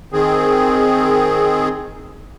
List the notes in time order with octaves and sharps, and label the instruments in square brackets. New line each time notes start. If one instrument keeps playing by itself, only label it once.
[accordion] D#3 C4 G#4